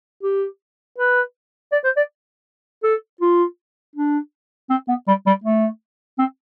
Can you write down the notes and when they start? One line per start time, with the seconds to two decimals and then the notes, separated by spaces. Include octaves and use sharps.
0.23 G4
0.98 B4
1.72 D5
1.84 C5
1.97 D5
2.84 A4
3.21 F4
3.96 D4
4.70 C4
4.89 B3
5.08 G3
5.26 G3
5.44 A3
6.19 C4